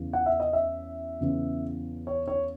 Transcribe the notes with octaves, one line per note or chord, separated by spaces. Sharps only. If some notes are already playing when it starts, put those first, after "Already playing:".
Already playing: E2 C#3 E3
F#5
E5
D#5
E5
E2 C#3 E3
C#5
C#5